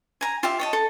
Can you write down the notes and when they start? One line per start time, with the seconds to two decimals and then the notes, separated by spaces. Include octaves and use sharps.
0.21 G#5 A#5
0.43 F4 G4 E5
0.59 C#5 D#5 A5
0.73 A4